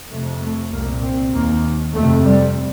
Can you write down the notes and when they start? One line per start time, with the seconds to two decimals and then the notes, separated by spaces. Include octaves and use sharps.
0.11 F2 C3 A3
0.41 A3
0.72 C2 A#2 A#3
1.03 C4
1.33 D#2 A#3
1.94 F2 C3 A3
2.25 G3